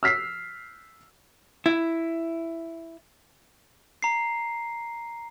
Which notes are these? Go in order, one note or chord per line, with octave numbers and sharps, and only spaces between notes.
E6 F6 B6 C7
E4
A#5 C7